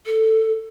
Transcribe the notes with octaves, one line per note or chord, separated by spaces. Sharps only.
A4